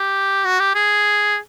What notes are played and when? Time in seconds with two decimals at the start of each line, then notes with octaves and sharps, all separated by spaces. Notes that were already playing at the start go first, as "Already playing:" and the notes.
Already playing: G4
0.45 F#4
0.60 G4
0.75 G#4